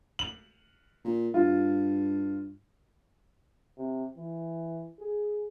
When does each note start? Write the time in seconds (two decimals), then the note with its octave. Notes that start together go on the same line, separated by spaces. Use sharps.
0.19 F#7
1.05 A#2
1.34 G2 F4
3.78 C3
4.17 E3
5.00 G#4